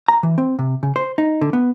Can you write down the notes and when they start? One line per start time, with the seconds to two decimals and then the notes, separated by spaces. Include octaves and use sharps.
0.08 A#5
0.23 E3
0.38 C4
0.59 C3
0.83 C#3
0.96 C5
1.18 D#4
1.41 D3
1.53 B3